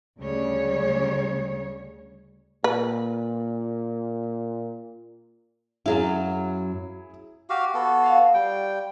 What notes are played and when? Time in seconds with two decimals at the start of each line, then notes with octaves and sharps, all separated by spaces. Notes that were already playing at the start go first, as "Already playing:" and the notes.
0.19 D2 C#3 G3 C#5
2.64 A#2 B4
5.86 F#2 F#3 E4 G#4 F5
7.50 F#4 G4 F5
7.74 B3 F#4 A4
8.04 F4 F5 C6
8.34 G3 G5